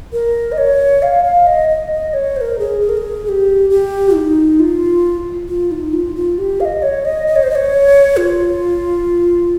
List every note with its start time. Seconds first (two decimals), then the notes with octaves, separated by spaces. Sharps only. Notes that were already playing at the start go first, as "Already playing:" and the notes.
0.13 A#4
0.52 D#5
0.58 C#5
1.02 F5
1.24 F5
1.47 D#5
1.69 D#5
1.92 D#5
2.14 C#5
2.36 C5
2.41 A#4
2.59 G#4
2.81 G#4
2.89 A#4
2.97 G#4
3.25 G#4
3.29 G4
3.70 G4
4.15 D#4
4.60 F4
5.49 F4
5.71 D#4
5.93 F4
6.16 F4
6.38 G4
6.60 F5
6.65 D#5
6.83 C#5
7.05 D#5
7.27 D#5
7.36 C#5
7.43 C5
7.51 D#5
7.55 C#5
8.17 F4